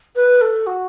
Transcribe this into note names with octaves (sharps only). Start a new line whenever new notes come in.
B4
A4
F#4